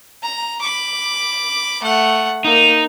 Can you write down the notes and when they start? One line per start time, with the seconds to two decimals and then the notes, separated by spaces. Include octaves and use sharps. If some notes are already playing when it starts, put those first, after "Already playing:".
0.23 A#5
0.61 B5 D6
1.82 A3 F#5
2.45 A#3 D#4